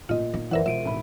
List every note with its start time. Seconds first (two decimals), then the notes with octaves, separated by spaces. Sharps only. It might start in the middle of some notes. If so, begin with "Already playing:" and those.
0.09 A#2 A3 F4 D#5
0.34 D#4
0.51 F#1 E3 A#4 C5 D5 E5 F#5
0.66 E1 B2 F4 C5 E5 D7 D#7
0.85 G#1 A2 E5 B5